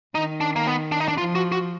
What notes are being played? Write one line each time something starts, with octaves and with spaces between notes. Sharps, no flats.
D#3 D#4
D4
A#3
B3
D4
D#4
D4
F3 F4
F#4
F#4